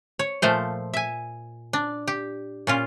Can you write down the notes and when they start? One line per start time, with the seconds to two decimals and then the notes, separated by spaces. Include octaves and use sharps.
0.19 C#5
0.42 A#2 F3 A3 C5
0.94 E5 G#5
1.73 D4
2.08 G4
2.67 A#2 C#4 F4